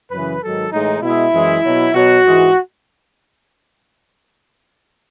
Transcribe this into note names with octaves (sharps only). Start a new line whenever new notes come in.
F#2 C#3 E3 B4
G#2 D#3 F#3 A4
A2 E3 G#3 D#4
B2 G#3 E4
F#2 E3 G#3
B2 F#3
B2 F#3 F#4
G#2 E3 G#3